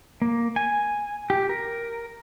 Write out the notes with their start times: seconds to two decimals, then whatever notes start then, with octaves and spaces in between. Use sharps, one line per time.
0.22 A#3
0.56 G#5
1.30 G4
1.49 A#4